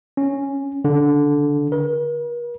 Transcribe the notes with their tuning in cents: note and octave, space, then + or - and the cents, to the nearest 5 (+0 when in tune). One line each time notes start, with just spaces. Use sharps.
C#4 -5
D3 -10
A#4 +45